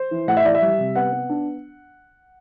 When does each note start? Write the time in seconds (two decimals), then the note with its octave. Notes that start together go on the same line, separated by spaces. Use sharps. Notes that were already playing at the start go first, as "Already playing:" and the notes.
Already playing: C5
0.11 E3
0.28 A2 F#5
0.37 E5
0.45 E3 D5
0.55 E5
0.62 G3
0.78 C3
0.95 B3 F#5
1.12 B3
1.29 D4